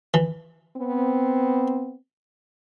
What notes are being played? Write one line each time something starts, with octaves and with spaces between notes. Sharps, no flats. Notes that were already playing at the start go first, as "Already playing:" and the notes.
E3
B3 C4